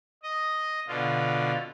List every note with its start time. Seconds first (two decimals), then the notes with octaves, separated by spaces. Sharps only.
0.23 D#5
0.87 B2 D3 F4